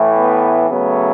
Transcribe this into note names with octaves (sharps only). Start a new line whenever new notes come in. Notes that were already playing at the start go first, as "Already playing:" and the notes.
Already playing: A2 E3 A3
B3
C#3 F#3 A3 B3